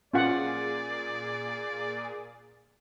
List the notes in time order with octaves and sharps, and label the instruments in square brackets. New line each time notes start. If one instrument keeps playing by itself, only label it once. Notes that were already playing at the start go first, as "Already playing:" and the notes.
[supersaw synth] A#2 G#4 [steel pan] C#4 F4 F#5 [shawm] D5